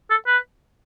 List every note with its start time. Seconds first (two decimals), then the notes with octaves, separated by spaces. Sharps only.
0.10 A4
0.27 B4